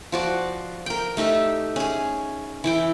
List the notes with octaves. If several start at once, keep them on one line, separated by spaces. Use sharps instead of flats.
F3 F#4 D5
A#4 G5
A3 D#4 G4 E5
C#4 G#4
E3 E4 G5